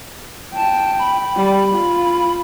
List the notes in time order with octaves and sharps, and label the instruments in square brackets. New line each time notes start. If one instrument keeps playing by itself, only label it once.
[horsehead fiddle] G5 [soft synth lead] A5
[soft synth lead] B5
[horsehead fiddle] G3
F4